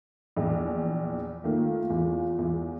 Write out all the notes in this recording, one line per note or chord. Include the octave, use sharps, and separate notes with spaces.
A#1 E2
D#3 A3 A#3 F4
E2
E2